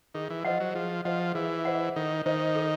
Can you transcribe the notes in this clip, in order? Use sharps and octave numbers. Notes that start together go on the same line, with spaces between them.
D#3 G#4
E3
F3 C5 D#5 F#5
F#3
F3 G#4
F3 C5 D#5 F#5
E3 G#4
C5 D#5 F#5
D#3 A4
D#3 C5 D#5
A4